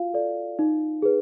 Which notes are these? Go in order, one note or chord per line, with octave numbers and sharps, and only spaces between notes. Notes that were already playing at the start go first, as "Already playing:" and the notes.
Already playing: F4 F#4 F5
A4 D5
D#4
G#4 B4